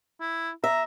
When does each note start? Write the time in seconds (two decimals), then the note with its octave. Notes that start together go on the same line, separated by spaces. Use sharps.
0.21 E4
0.64 E5 A#5